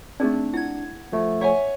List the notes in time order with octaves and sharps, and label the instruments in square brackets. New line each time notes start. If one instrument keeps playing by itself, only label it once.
[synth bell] A3 C4 [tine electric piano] D4 [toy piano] D#4 G#4 D5
[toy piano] E4 [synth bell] F#5 G#6
[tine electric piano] F3 A3
[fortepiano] C#5 [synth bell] E5 F#5 G#5